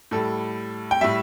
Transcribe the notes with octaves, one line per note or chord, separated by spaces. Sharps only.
A2 G3 A4
G5
A2 G3 E5